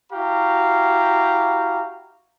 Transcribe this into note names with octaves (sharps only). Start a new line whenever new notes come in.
E4 F#4 G4 F5 A#5